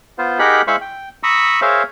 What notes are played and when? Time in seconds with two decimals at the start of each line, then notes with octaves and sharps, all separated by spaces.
0.18 B3 F4 C5
0.39 D#4 G4 G#4 A#4 F#5 B5
0.67 G#3 E4 C5 F5 B5 C#6
0.81 G5
1.23 A#5 B5 C#6 D#6 E6
1.62 G#4 A#4 C5 C#5 E5 F5